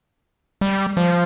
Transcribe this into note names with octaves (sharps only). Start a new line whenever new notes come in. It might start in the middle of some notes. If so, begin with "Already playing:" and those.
G3
F3